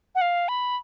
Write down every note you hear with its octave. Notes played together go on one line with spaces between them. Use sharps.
F#5
F5
B5